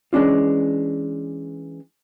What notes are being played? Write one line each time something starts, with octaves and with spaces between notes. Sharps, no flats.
E3 G#3 C#4 D4 F4